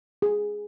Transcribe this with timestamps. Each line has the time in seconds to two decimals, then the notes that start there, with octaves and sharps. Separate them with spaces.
0.22 G#4